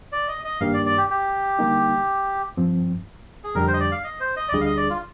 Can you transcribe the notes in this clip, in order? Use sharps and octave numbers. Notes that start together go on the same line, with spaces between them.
D5
D#5
D#5
G2 D#3 A#3 D4 G4 F5
D5
D5
G4
G4
D3 G3 A#3 D#4
G2 F3 C4
G#4
F2 D3 G3 D4 G4 A#4
C5
D#5
D5
F5
D#5
C5
D#5
D5
D2 D3 G3 D4 G#4 D#5
F5
D#5
D5
F4